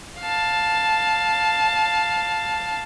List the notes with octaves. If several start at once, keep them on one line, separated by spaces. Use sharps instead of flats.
F5 A5